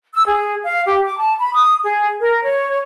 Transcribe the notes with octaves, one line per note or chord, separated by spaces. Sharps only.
E6
G#4
F5
G4
D6
A5
B5
D#6
G#4
A#4
C#5